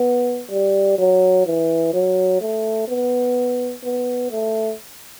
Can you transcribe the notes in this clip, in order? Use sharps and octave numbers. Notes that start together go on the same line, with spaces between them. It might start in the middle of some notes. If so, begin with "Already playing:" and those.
Already playing: B3
G3
F#3
E3
F#3
A3
B3
B3
A3